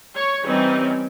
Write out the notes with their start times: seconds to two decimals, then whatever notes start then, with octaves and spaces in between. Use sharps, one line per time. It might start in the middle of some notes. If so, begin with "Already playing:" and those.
0.15 C#5
0.45 E3 G3 C4 C#4 D#4